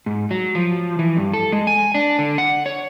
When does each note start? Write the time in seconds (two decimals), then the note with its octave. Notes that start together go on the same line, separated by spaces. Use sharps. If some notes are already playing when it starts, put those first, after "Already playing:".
0.06 G#2
0.31 F#3
0.55 F3
0.99 E3
1.17 G2
1.33 A4
1.52 G#3
1.67 G#5
1.94 D4
2.19 D3
2.38 F#5
2.66 C#5